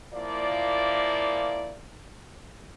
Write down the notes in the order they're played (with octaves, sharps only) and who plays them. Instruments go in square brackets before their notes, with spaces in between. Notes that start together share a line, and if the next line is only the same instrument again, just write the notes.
[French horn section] A#2 F3 A#3 E4 D5